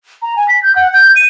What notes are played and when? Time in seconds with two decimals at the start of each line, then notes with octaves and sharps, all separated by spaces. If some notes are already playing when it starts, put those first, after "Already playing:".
0.22 A#5
0.36 G#5
0.48 B6
0.63 G6
0.75 F#5
0.93 G6
1.16 D#7